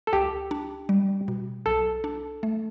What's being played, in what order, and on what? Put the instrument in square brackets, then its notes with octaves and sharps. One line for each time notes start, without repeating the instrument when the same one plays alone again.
[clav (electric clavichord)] A4
[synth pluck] C#2 [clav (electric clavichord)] G4
[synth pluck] D4
G3
B2
[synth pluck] B1 [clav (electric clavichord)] A4
[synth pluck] D4
A3